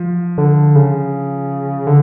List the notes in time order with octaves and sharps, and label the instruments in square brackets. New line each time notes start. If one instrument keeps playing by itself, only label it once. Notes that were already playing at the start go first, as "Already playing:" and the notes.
Already playing: [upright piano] F3
[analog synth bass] D3
C#3
D3